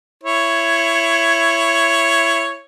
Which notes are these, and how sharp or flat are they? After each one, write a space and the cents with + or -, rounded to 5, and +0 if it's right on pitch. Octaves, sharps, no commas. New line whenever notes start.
E4 +20 C#5 +0